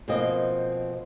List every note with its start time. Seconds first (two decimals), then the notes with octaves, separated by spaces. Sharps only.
0.08 B2 F3 A#3 C4 D#5